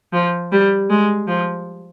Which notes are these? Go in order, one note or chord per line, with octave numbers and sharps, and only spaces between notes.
F3
G3
G#3
F3